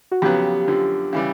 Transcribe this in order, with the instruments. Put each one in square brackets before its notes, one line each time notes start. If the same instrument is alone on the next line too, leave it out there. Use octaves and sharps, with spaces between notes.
[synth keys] F#4
[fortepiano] F2 C#3 F#3 B3 [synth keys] G4
[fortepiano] F#2 D3 F3
C#3 E3 G3